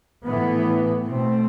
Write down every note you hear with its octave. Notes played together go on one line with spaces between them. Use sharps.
A2 E3 B3
B2 A3 C4